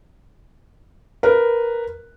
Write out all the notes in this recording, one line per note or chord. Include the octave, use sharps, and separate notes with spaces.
A#4 B4